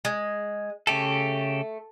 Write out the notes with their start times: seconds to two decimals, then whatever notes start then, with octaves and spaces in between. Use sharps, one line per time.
0.05 G#3
0.87 C#3 A3 G4 A4